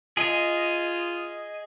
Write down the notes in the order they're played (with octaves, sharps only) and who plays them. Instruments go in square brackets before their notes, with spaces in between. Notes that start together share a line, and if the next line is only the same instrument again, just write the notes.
[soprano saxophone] F4 [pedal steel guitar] G#4 D#5